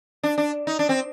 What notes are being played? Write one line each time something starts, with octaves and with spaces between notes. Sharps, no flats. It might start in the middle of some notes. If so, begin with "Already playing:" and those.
D4
D4
D#4
D4
C4